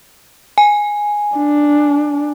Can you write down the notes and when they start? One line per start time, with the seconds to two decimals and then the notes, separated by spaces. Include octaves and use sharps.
0.58 G#5
1.36 D4